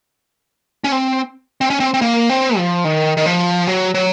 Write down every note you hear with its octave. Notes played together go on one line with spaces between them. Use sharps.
C#4
C4
C4
C#4
C4
C4
A#3
C4
F3
D#3
D#3
F3
F#3
F#3